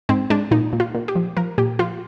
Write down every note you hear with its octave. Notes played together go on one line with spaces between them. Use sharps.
G#2 C4
G#2 D4
A#2 D#4
A#2
F4
A#2
G4
F3
F3 A#4
A#2 G4
F3 F4